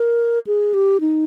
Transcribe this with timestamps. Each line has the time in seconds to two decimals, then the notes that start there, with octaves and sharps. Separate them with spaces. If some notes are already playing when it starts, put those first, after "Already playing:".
Already playing: A#4
0.47 G#4
0.74 G4
1.01 D#4